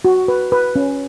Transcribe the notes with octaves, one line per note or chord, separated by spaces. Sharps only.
F#4
B4
B4
C#4